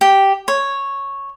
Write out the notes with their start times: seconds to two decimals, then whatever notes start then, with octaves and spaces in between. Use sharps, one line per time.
0.01 G4
0.48 C#5